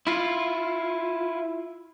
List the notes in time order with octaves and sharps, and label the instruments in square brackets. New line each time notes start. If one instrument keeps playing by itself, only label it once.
[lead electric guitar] E4 F4